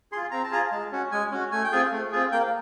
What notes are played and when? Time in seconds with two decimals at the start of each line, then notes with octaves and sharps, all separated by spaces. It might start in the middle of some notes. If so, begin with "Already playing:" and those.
0.12 G#4 C6
0.16 F4
0.31 C4 A#5
0.44 A5
0.52 F4 G#4 A#5
0.71 G#3 A5
0.92 C#4 F#4
1.12 G#3 G#5
1.32 C#4 F#4
1.52 A3 G#5
1.64 G5
1.72 C4 F4 G#4 G#5
1.91 A3
2.12 C4 F4 G#4
2.32 A#3 G5